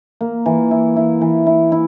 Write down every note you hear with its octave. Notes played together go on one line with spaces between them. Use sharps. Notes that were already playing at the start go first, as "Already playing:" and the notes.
A#3
E3
E4
E4
E3
E4
E4